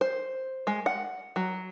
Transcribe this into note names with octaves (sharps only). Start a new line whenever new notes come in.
C5
G#3
F#5
F#3